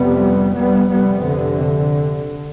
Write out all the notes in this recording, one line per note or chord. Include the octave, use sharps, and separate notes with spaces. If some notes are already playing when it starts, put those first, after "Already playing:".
Already playing: F2 C3 G3 B3
G3 B3
F2 C3 G3 B3
D3